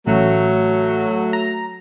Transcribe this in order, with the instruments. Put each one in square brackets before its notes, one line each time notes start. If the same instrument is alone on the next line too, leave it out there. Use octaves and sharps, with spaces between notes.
[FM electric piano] A1 [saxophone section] F#3 A3
[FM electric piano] A#5